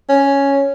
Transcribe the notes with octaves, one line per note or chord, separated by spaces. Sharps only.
C#4